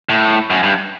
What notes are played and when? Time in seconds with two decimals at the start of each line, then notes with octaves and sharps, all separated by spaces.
0.09 A2
0.50 F#2
0.63 G2